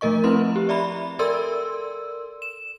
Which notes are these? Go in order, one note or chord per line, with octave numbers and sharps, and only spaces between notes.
F3 A3 A#4 D#5 C#6
C4 E4 B4 C6
G4
D5 E5 A#5 B5
A4 A#4 D5 C6 E6
E7